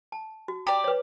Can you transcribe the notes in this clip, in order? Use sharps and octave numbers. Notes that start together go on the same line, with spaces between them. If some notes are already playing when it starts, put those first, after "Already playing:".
A5
F#4
G4 D5 A#5
B4 C#5